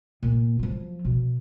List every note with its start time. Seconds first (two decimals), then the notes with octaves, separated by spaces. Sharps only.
0.23 A#2
0.59 F3 F#3
1.05 B2